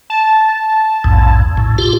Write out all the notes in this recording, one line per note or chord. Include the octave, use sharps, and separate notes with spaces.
A5
A#1 E2 G#2
A2
F4 G4